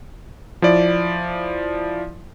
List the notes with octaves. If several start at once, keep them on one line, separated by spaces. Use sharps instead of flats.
F3 E4 D5